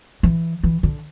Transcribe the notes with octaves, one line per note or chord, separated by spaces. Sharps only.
E3
E3
D3